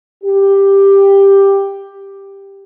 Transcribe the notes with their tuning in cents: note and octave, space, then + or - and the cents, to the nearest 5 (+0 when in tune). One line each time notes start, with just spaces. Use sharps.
G4 +10